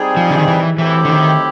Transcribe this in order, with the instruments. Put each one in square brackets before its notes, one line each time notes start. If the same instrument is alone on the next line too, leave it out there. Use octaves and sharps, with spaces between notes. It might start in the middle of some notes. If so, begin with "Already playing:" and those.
Already playing: [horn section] G3 C4 D#4 G#4
[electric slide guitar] F3
D3
D#3
E3
[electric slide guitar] E3 [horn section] F#3 A3 C4 E4 G4
[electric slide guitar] D3
D#3